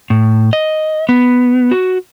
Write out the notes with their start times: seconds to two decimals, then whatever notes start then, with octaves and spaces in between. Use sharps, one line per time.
0.10 A2
0.53 D#5
1.09 B3
1.71 F#4